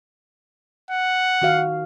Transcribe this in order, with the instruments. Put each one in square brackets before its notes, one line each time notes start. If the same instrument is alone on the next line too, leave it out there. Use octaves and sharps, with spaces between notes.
[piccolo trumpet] F#5
[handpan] D#3 F#4 F5